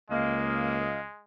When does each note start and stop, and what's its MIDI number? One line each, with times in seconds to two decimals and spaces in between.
0.10 1.04 37
0.10 1.24 56
0.10 0.85 58
0.10 1.00 75
0.10 1.00 77